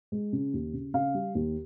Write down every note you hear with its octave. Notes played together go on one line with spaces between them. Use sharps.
G#3
C#3
D#2
C#3
C#3 F5
G3
D#2